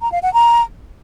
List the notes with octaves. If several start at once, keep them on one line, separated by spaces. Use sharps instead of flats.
A#5
F5
F#5
A#5